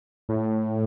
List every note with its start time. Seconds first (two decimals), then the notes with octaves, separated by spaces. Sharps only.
0.29 A2